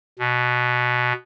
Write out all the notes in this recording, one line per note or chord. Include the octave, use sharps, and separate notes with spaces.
B2